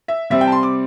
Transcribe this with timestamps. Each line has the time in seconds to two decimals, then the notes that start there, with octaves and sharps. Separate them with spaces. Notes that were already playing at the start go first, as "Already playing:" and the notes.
0.08 E5
0.30 C3 G3 C4 E5
0.41 G5
0.47 A5
0.52 C6
0.63 D6